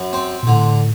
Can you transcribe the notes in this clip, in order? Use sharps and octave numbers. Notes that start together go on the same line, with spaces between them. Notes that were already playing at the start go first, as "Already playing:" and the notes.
Already playing: F#2
C4
A#2
A2 D3